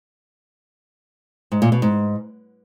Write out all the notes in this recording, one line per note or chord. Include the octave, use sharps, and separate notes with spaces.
G#2
A#2
B2
G#2